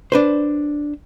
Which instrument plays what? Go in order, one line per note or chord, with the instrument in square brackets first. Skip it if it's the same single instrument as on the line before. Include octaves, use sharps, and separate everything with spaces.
[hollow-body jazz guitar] D4 B4 C5